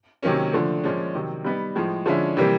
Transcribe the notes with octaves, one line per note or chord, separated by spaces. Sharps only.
C3 D#3 F#3 A#3 C#4
D3 F3 A3
A#2 F3 G#3 C#4
C3 D#3 F#3
G3 B3 D#4
A2 F3 G#3
D3 F3 G#3 C#4 E4
C3 E3 G3 A#3